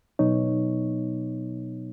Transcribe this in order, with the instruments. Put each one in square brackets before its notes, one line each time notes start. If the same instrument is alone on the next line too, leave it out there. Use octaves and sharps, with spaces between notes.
[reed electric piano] B2 F#3 B3 D#4 C#5